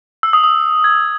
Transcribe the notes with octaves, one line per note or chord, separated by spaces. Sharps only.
E6
D#6
D#6
G#6